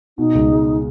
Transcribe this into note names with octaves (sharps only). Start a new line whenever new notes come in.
B2 D#4
C#2
G#3